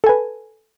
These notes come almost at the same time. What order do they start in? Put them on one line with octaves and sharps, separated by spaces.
A4 G#5 B4